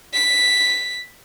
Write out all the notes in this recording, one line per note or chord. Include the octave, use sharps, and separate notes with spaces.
B6